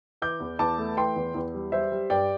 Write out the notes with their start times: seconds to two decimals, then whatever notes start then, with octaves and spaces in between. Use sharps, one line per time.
0.22 E3 D6 G6
0.40 E2
0.59 E2 A5 D6
0.79 A3
0.97 E3 G5 C6
1.16 E2
1.35 E2
1.54 G3
1.72 G3 C5 E5
1.92 G3
2.10 G2 D5 G5